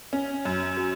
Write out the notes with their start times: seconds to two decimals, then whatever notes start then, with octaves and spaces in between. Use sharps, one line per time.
0.13 C#4
0.45 F#2
0.77 F#3